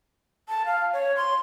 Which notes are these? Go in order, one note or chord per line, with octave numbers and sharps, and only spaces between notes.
A5
F5
C#5
C6